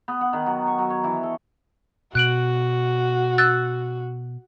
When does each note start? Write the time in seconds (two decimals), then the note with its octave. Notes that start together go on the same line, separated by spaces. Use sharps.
0.08 B3
0.21 F#5
0.33 D#3
0.46 F#3
0.67 C#6
0.79 F#3
0.90 C#5
1.04 E3
1.23 A4
2.15 B2 F#4 F#6 D7 F#7
3.38 E6 F#6 A6